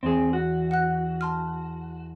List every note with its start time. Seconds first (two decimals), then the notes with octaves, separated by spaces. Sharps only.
0.03 E2 C4 G#4
0.33 F#4
0.71 F#5 F#6
1.21 A5 C6 F6